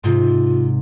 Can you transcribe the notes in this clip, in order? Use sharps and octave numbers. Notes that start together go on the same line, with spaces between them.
G#2 C3 F4